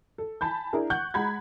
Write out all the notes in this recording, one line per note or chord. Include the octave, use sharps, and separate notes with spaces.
A4
G#5 A5 B5 G6
D4 E4 G#4 A#4
F#5 C#6 F#6 G6
G#3 F#5 A#5 B5 G6 G#6